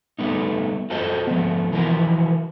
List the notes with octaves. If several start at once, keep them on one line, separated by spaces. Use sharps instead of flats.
G3 A3 B3 D#4
F4 F#4 A4 C5 D#5
F3 A3 B3
E3 F3 E4 F#4 A#4